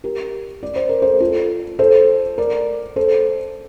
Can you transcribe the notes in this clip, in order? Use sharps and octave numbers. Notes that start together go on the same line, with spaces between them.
G4 A#4
D5
C5
A#4
A4 C5
F4 A4
A4 C5
A#4 D5
A4 C5